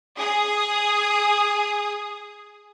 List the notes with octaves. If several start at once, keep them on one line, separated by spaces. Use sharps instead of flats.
G#4 D#6